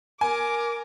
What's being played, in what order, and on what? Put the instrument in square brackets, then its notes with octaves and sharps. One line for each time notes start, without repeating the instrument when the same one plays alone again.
[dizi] A#4 [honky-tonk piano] G#5 [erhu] D6